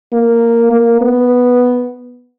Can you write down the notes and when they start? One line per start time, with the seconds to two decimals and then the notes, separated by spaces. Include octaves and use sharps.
0.13 A#3
0.72 A#3
1.01 B3